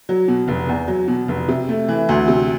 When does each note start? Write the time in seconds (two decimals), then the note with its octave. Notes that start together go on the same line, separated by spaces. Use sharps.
0.09 F#3
0.28 B2
0.48 F1
0.69 E2
0.88 F#3
1.08 B2
1.28 F1
1.48 C3
1.69 A3
1.88 E3
2.09 D2
2.28 C3